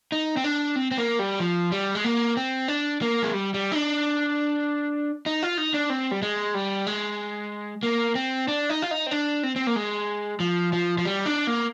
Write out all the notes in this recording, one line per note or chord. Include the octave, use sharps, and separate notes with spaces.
D#4
C4
D4
C4
C4
A#3
G3
F3
G3
G#3
A#3
C4
D4
A#3
G#3
G3
G3
D#4
D4
D#4
F4
D#4
D4
C4
G3
G#3
G3
G#3
A#3
C4
D4
D#4
F4
D#4
C4
D4
C4
C4
A#3
G#3
F3
F3
F3
G3
D4
A#3